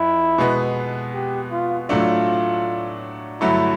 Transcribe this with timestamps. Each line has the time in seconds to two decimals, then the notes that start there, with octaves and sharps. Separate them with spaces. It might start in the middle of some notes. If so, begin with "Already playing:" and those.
Already playing: F2 E4
0.38 B2 G#3 B3
1.14 G4
1.52 F4
1.89 A2 F#3 A3 D4 F4
3.41 G2 D3 F#3 A3 E4